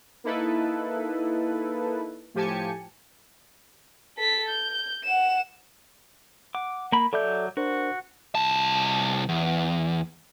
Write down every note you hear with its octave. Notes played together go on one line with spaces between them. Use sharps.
A#3 D#4 E4 A4 B4
A2 F3 G4 G#5 A5 C#7
A4 B6
G6
F#5 E7
F#5 D6
A#3 B5
F#3 A4 D5 E5 D6 G6
D4 F#4 A#4 C5
C2 A5
E2